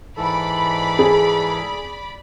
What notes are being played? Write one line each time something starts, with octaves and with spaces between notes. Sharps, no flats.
G#2 E3 A4 D5 B5
G#4